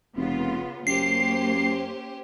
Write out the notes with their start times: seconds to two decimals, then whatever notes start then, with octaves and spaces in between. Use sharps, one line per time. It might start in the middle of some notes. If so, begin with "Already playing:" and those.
0.16 F1 C#3 B3 F4
0.87 F#2 A#3 C#4 G4 C5 C7